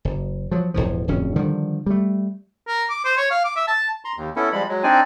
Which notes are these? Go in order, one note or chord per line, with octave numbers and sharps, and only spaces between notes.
F#1
F3 F#3
E1 A#1 A2 F3
D1 F2 C#4
D3 D#3 F3 G3
G3 A3
A#4
D6
C5
C#5
F5
D6
E5
A5
A#5 C6
D#2
B3 C#4 E4 A4
F3 G3 G#3 B5
F#3 G#3
C4 D4 D#4 D5 G#5